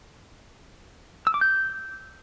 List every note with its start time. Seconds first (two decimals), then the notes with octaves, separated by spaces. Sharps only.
1.27 E6
1.34 D6
1.41 G6